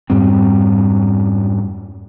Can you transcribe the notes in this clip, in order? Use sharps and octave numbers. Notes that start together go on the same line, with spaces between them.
F2 G#2 G3 C4